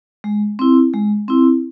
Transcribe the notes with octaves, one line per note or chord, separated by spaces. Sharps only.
G#3
C4 E4
G#3
C4 E4